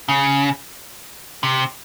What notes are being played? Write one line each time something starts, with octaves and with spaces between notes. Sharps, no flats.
C#3
C3